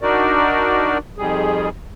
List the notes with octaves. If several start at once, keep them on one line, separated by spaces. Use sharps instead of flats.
D4 D#4 F#4 A#4 D5
F2 D#3 G3 G#4